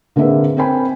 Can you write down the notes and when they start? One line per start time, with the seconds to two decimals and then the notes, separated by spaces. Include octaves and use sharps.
0.16 D3 A#3 C4 G#4 B4 E5
0.57 C4 A#4 G5 G#5 B5